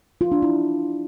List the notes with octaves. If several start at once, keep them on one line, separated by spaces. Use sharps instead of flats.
F4
D4
E4